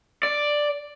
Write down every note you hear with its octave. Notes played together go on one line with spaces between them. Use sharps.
D5